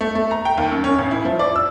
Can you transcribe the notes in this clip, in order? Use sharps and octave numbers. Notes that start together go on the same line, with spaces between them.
A3
A3
A#5
G5
D#2
F#2
C#4
A1
E4
F3
D5
E6